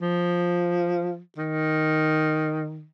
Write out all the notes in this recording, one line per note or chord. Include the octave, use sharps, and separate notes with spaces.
F3
D#3